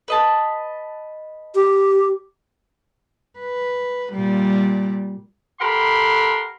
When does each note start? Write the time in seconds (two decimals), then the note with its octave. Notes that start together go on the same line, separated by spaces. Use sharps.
0.08 B4 D#5 A5
1.55 G4
3.39 B4
4.13 A#2 G3
5.60 G4 A4 A#4 F#5 B5 C6